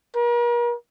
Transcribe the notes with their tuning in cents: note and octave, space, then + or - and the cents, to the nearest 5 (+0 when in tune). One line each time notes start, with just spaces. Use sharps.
A#4 +40